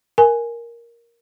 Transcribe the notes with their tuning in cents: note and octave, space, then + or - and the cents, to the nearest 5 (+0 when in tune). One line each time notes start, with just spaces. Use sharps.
A#4 +5 G#5 +0